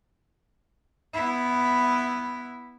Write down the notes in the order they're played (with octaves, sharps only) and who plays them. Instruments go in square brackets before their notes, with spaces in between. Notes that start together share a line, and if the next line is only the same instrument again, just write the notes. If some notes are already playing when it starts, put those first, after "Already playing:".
[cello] B3 E4